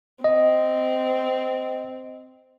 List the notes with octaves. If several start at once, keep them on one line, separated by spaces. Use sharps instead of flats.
C4 D#5